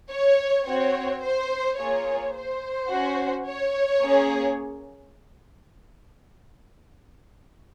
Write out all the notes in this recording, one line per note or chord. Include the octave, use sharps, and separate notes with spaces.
C#5
C4 F#4 C#5
C5
A#3 F4 G#4 C#5
C5
C#4 F#4
C#5
A#3 C#4 G#4